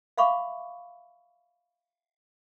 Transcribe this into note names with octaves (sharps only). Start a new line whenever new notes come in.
E5 F5 B5 C#6 D6